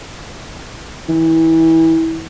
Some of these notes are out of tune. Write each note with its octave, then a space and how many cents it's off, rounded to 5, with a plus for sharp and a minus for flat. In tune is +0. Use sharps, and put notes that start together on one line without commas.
E3 -25